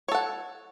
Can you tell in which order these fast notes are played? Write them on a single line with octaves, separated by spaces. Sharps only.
C#5 A4 F#5